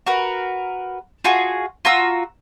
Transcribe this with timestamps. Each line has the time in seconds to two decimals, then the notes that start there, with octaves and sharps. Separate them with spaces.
0.07 F#4 A#4 B4
1.24 F4 F#4 G#4
1.85 F4 F#4 A#5 E6